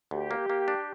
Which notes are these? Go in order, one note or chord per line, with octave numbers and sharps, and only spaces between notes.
D2 G4
A#3
A#3
D4